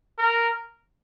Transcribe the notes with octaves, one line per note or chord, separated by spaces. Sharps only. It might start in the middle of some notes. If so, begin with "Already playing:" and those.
A#4